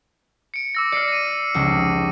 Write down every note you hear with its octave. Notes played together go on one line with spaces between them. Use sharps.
C#7 D7
D6 E6 A#6
D5 F6 C7 C#7
A#6 D#7
F1 C#2 D#6